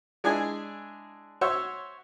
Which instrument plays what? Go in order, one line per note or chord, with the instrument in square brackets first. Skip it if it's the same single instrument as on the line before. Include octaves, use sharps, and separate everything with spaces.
[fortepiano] G#3 D4 E4 G#4 G#5
F#4 C5 C#5 E5 C#6